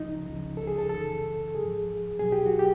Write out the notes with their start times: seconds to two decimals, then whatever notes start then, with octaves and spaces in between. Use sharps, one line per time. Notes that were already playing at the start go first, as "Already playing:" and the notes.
Already playing: C#2 C#3 F3 D#4
0.24 C#2 C#3 F3
0.57 A4
0.67 G#4
0.78 A4
0.89 F#2 C#3 E3 A4
1.55 G#2 F3 G#4
2.19 E2 B2 F#3 G#4
2.32 G4
2.46 F#4
2.59 G4